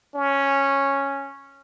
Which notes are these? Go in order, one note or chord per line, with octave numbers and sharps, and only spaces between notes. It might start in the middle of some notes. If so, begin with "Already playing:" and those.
C#4